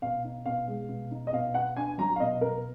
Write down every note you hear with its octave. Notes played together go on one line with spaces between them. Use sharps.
B2 F5
D#4
B2 F5
G#3
B2
D#4
D#5
B2 F5
B3 F#5
D4 G#5
F#3 A#5
F5
B2 D#5
B3 A#4